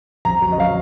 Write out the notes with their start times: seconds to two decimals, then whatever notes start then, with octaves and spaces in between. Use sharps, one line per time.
0.25 F2 A#5
0.42 F#3
0.52 D#5
0.58 F#3 F5